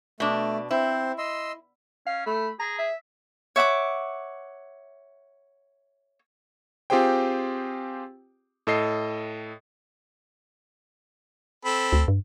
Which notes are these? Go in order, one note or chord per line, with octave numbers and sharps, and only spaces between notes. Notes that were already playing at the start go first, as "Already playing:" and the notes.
B2 A3 D4
C4 E4 C5
D#5 C6 E6
C#4 F5
A3 B5
G#4 A#5
E5
C#5 E5 F#5 D6
C4 F4 G4 G#4 C5 G5
A2 A4 D#5 C7
C4 A4 B5
D2
G2